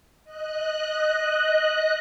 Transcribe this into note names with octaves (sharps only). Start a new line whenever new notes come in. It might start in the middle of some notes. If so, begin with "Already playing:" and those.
D#5 F#6